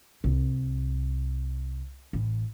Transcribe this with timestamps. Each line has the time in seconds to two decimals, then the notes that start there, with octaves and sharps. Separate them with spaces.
0.24 C2
2.13 A1